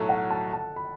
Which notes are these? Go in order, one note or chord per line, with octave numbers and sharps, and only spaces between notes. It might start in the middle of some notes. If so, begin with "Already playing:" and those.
Already playing: B1 A2 F#3 A3 A4
F#5
A5
A5
B5